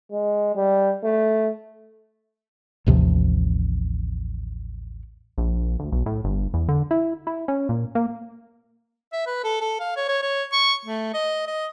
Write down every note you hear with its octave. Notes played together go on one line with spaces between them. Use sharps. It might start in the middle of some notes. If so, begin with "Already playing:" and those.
G#3
G3
A3
A1 D#2 C3 F3
A#1
D2
B1
A2
G1
E2
D3
E4
E4
C#4
A#2
A#3
E5
B4
A4
A4
F5
C#5
C#5
C#5
C#6
A3
D#5
D#5